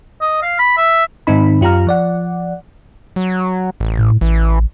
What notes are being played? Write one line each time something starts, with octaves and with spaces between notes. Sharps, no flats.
D#5
F5
B5
E5
G#2 D#3 C4 D#4 B5
F#2 F4 G4 A#5 F6
F3 D5 F#5
F#3
A1
A2
A1 E3